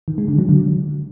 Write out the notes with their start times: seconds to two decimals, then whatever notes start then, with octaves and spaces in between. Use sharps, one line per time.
0.08 D#3
0.18 G#3
0.28 D3
0.39 F#3
0.49 D3